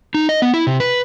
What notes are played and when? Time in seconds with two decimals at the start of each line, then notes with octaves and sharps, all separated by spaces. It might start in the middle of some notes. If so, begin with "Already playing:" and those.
0.14 D#4
0.29 D#5
0.42 B3
0.54 E4
0.67 C3
0.80 B4